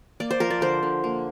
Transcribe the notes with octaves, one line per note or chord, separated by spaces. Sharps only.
A#3 D5
C5
F3 A#4
D5
D3 C5
D3
A#3